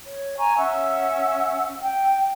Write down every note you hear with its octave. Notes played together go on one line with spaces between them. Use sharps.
C#5
G#5 A#5 C#6
C#4 E5 F#5 E6
G5